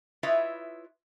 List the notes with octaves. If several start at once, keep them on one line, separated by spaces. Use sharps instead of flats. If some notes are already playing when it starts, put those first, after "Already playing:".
E4 F4 B4 C#5 D#5 E5